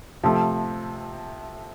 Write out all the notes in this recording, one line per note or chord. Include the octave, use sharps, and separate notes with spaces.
C3 F3 A3